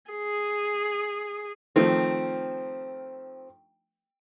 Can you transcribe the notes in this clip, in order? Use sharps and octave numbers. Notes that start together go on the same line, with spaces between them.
G#4
D#3 F3 A3 C4